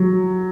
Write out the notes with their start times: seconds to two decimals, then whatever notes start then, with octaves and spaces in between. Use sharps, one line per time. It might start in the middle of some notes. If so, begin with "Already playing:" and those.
Already playing: F#3